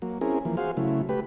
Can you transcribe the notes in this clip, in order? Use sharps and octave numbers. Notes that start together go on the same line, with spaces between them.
F#3 A#3
C4 C#4 E4 G#4 A#4
E3 F3 A#3
F#4 G#4 C5 F5
C#3 F#3 A3 E4
A3 G4 B4